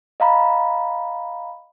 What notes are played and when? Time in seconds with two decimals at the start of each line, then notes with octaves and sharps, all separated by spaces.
0.20 D#5 F5 A#5 B5